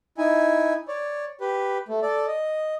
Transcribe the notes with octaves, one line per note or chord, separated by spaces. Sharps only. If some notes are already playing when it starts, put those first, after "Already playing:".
D#4 E4 G#5
C#5 D5
G4 B4
A3
A4 D5
D#5